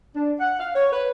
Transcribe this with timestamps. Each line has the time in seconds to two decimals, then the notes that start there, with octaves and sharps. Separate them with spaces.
0.15 D4
0.39 F#5
0.59 F5
0.75 C#5
0.92 B4